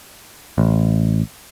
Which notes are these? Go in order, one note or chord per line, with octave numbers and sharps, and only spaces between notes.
A1